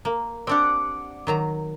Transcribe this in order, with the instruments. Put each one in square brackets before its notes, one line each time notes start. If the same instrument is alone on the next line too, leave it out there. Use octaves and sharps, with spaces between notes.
[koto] A#3
[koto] C4 D4 G4 [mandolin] D5 F#5
[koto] D#3 F#3 A#5